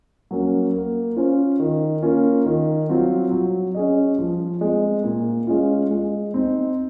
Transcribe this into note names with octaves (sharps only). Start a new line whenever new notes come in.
F#3 A#3 C#4
A#3
C#4 F4 C5
D#3
A#3 C#4 F4
D#3
F#3 C4 F4
F#3
C#4 G#4 D#5
F3
G#3 C4
A#2
G#3 C#4 F4
G#3
C4 D#4